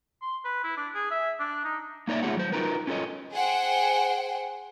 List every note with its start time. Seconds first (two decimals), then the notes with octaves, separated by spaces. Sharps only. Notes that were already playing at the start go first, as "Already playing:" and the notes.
0.22 C6
0.45 B4
0.64 E4
0.77 D4
0.95 G#4
1.11 E5
1.39 D4
1.65 D#4
2.08 A#3 D#4 C#5 D5 E5
2.23 A3 B3 F4 G#4 C#5 F#5
2.37 F#3 C5
2.52 D#4 F4 F#4 A#4 B4
2.87 C#4 F4 A4 C#5 D#5
3.32 G#4 C5 F#5 G5